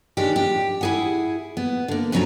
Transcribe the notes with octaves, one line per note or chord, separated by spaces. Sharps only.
D#3 G#3 C#4 D4 G4
G4
E4 G#4 F#5
B3
D3 A#3
G2 A#2 F3 F#3 C#4 A#5